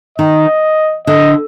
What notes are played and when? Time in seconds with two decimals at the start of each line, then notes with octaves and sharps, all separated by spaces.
0.18 D#3 D#5
1.07 D3 D#5